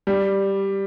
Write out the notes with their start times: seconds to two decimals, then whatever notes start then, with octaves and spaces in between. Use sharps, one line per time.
0.07 G3